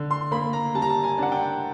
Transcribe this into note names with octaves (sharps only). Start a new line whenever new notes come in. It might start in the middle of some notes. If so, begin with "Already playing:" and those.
Already playing: D3
C6
A#3 B5
A#5
G3 A5
A#5
A5
G#5
D4 F#5
G5